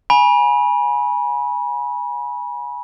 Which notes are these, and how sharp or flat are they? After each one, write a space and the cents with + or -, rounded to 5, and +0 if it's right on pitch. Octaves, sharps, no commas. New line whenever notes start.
G#5 +0 B5 -30